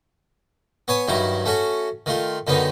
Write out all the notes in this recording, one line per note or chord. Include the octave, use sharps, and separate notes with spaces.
B3 C#5 G#5
G2 D#3 F#3 E4
A3 C#4 F#4
D#3 A3 F4
F#2 D3 D#3 B3 D#4